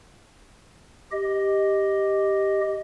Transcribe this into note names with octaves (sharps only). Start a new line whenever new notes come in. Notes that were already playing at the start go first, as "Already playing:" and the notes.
G4 D#5